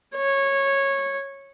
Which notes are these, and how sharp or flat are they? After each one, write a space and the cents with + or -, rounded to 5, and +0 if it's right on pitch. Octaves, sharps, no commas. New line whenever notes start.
C#5 -15